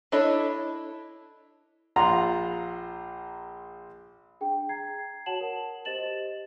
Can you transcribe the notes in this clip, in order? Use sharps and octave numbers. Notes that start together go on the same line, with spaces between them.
D4 E4 A4 C#5 D#5
A#1 F4 F#5 A#5
D4 G#4 G5
A#5 G#6 C7
F#4 C#5 F#5 A5 E7 F#7
A#4
G4 C5 D#5 A6 E7 F#7